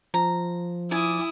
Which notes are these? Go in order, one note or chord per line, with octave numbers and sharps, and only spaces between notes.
F3 A#5
E4 D5 G#5 D#6